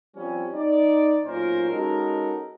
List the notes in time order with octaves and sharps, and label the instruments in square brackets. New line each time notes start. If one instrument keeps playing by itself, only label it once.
[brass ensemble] F3 G3 C4 C#4
D#4 D5
B1 A#2 C#4 F4 A#4 C5
G#3 C#4 D#4 F#4 A4 A#4